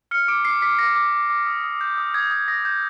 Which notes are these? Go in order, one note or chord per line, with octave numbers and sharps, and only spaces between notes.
F6 C#7
D6 D7
D6 C7
D6 B6
D6 A#6
D6
D6
D6
D#6
D#6
G6
D#6
D#6 G#6
D#6 G#6
D#6 A#6
G6